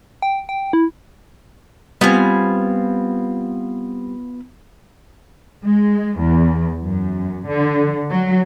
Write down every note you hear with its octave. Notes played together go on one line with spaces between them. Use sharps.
G5
G5
E4
G3 B3 C4 F4 G#5
G#3
E2
F#2
D3
F#3